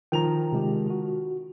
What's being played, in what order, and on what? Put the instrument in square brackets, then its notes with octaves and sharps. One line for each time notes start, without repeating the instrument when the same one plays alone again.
[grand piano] D#3 F3 F7 [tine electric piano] G5 A#5
[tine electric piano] C3 G#3 G4
F#4